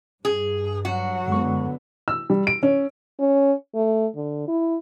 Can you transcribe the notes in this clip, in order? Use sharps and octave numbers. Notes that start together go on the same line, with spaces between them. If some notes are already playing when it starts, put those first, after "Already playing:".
G2 G#4
F#3 F#4 F#5
F#2 D3 G#3 B3 C#6
E6
G3
D7
C#4
C#4
A3
D3
E4